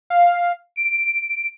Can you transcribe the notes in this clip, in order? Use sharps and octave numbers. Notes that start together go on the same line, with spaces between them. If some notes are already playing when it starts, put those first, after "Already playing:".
F5
D7